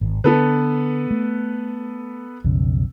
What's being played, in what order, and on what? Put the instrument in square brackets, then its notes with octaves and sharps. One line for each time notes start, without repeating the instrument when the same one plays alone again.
[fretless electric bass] G#1
[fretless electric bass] D3 [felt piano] B3 A4 B4
[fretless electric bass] A3
B1 F2 C#3